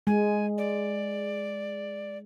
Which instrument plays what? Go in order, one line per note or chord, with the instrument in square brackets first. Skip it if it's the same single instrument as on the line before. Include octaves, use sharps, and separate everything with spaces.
[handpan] G#3 [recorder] G#5
[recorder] D5